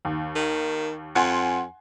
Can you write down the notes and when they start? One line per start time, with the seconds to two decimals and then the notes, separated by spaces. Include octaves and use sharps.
0.05 D#2
0.36 D#3
1.15 F2 F#5 G#5 C6